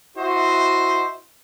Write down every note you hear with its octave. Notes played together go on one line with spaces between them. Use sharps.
E4 F#4 C5 D#5 E5